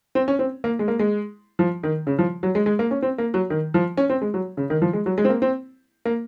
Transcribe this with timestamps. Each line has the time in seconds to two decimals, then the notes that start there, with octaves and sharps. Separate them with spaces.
0.15 C4
0.28 C#4
0.39 C4
0.64 A#3
0.79 G#3
0.88 A#3
0.99 G#3
1.59 F3
1.83 D#3
2.07 C#3
2.19 F3
2.43 F#3
2.55 G#3
2.66 G#3
2.79 A#3
2.91 C#4
3.02 C4
3.18 A#3
3.34 F#3
3.50 D#3
3.74 F3
3.97 C#4
4.10 C4
4.22 G#3
4.34 F#3
4.57 C#3
4.70 D#3
4.82 F3
4.93 G#3
5.06 F#3
5.18 G#3
5.25 C4
5.29 A#3
5.42 C4
6.05 A#3